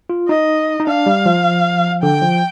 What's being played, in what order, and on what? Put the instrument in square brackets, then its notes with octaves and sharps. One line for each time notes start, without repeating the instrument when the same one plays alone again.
[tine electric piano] F4
[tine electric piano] D#4 [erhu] D#5
[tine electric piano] D#4
[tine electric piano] D4 [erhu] F5
[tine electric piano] G3
F3
[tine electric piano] D3 [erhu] G5
[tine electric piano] F3